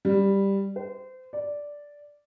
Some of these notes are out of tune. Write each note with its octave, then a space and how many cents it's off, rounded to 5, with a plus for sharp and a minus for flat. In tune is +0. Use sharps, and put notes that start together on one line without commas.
G3 +5
C5 -30
D5 -5